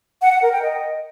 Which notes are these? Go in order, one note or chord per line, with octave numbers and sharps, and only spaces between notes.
F#5
F#5
A#4
G5
D#5